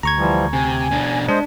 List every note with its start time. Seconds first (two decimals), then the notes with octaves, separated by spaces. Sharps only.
0.03 D2 A#5 C#6 G#6
0.18 E3 F3 G3
0.53 C3 G#5
0.91 B2 D4
1.28 G#3 D4 C5 D#5